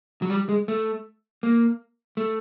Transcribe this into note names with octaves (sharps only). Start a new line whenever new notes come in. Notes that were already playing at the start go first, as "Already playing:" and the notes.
F#3
G3
G#3
A3
A#3
A3